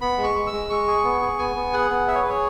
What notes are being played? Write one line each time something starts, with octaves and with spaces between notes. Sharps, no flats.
B3 B5
G#3
C#6
G#3
E6
G#3
G#3 C#6
G#4
B3
G#4
B3 G#5
B3
G#4 F#5
B3
G#4 E5
C#5
B4
G#4 C#5